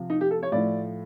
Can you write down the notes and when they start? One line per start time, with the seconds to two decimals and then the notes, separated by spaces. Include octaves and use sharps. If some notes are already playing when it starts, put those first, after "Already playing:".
Already playing: C3 F3
0.10 D#4
0.21 G4
0.31 A4
0.43 C#5
0.52 A2 F3 D5